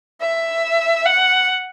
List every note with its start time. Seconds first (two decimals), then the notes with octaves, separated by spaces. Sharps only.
0.21 E5
1.06 F#5